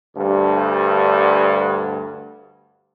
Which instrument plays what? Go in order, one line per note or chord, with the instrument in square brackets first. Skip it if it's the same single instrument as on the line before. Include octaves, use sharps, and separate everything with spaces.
[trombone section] D2 G2